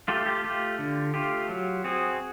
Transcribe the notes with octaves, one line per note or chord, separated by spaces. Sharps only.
A3 F4 G4
F4 G4
A3 F4 G4
D3
A3 F4 G4
F#3
C4 F#4 G#4